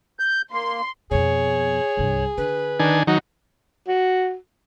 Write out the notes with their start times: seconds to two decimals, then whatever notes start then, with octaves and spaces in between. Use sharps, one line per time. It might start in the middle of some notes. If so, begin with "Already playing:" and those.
0.19 G6
0.52 A#3 C6
1.11 F2 B2 G#4 C#5
1.97 C2 G2
2.37 D3 B4
2.80 D#3 D4 G#5
3.07 D#3 F#3 D#4 F#5
3.88 F#4